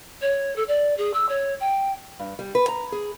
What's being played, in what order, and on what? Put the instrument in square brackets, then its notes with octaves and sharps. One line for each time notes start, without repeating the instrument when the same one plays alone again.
[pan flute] C#5
A4
D5
G#4
E6
C#5
G5
[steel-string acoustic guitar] G2
G3
B4
A#5
G#4